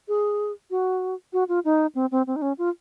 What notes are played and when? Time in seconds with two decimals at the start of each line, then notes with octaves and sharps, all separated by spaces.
0.08 G#4
0.71 F#4
1.33 F#4
1.49 F4
1.65 D#4
1.95 C4
2.11 C4
2.27 C4
2.36 D#4
2.42 C#4
2.58 F4